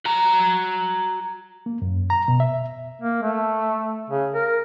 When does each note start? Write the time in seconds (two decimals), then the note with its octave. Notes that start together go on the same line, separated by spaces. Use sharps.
0.05 F#4 A#5
1.66 A#3
1.82 F#2
2.10 A#5
2.28 B2
2.40 E5
3.02 A#3
3.23 A3
4.10 C#3
4.34 A#4